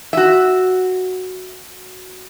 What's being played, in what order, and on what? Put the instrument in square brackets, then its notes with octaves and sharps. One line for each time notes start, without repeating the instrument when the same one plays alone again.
[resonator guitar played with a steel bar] F#4 E5